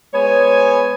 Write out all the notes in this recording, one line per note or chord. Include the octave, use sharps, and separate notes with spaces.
G#3 B3 C#5 G#5